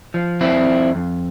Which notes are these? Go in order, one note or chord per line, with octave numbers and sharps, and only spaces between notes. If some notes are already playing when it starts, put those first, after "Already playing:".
F3
F2 C4 E4
F2
F2